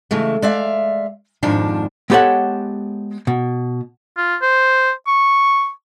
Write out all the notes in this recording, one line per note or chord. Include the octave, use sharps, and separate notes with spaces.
C#3 E3 G#3 A3
G#3 D5 E5 F5
F2 G#2 D#3 F3 D4
G#3 B3 G4 A4 C#5 F#5
B2
F4
C5
C#6